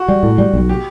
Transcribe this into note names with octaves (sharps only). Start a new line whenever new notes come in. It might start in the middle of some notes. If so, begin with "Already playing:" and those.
Already playing: F#4
G3
A2
G3
B1
G4